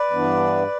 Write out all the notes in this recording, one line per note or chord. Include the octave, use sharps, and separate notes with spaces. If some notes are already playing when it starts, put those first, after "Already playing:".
Already playing: B4 D5
G2 E3 B3 D4